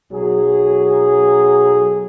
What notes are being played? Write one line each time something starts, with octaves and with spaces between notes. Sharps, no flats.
B1 F#3 G#4